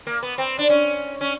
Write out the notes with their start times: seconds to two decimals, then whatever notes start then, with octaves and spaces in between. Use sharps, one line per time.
0.07 A#3
0.23 B3
0.38 C4
0.58 D4
0.70 C#4
1.21 C#4